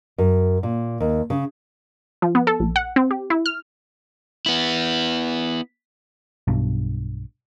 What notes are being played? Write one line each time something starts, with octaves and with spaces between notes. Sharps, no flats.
F#2
A#2
D#2
C#3
F3
B3
A4
A#1
F#5
C4
G4
E4
F6
B3 E4
B1 G2 B2